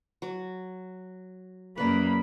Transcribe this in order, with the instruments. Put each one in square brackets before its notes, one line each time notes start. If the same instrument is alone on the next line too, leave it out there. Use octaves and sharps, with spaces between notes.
[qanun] F#3
[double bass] F#2 C#3 [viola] A#3 [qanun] B4 D5 [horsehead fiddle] B5